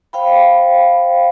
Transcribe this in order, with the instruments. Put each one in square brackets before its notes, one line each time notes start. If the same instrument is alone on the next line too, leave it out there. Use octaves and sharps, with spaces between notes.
[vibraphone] C5 F5 G5 B5